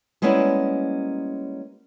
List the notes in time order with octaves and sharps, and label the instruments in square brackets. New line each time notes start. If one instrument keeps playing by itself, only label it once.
[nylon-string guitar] G3 G#3 A#3 B3 C#4 E4